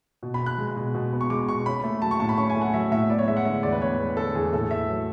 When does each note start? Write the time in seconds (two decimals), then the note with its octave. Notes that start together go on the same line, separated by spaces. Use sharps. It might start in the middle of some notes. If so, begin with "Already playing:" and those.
0.23 B2
0.34 B5
0.41 B3
0.46 F#6
0.58 G#3
0.76 B2
0.94 B2
1.13 B3
1.21 C#6
1.30 G#3 D6
1.48 B2 C#6
1.66 C#4 B5
1.84 A3
2.02 F#3 A5
2.11 C#6
2.20 A2 A5
2.29 B5
2.38 C#4 C#6
2.50 G#5
2.56 A3
2.62 F#5
2.74 F#3 E5
2.92 A2 E5
3.10 B3 D5
3.19 C#5
3.28 G#3 E5
3.37 F#5
3.45 D3 E5
3.63 E2 D5
3.72 B4
3.82 B3 C#5
3.99 G#3 B4
4.17 D3 A4
4.35 E2 G#4
4.53 A2 A4
4.71 A3 E5
4.89 F#3